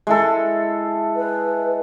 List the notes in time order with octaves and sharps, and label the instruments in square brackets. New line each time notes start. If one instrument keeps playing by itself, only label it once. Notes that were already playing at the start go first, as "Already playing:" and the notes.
[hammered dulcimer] G#3 E4 A4
[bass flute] B4